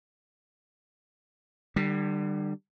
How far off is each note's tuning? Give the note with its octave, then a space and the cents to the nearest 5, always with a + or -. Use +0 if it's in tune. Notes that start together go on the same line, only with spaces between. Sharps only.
D3 +40 G3 +0